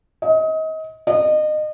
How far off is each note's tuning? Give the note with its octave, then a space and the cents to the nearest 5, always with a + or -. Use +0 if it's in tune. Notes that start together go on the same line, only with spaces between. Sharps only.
D#5 +30
D#5 -30